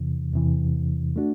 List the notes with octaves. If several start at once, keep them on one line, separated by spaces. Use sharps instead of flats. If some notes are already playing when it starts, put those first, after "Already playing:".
Already playing: E2 C3 E3
E2 C3 E3
A3 D4 F#4